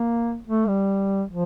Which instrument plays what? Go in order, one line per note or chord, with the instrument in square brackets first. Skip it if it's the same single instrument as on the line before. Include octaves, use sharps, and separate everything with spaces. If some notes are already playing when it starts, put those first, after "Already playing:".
Already playing: [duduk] A#3
A3
G3
F3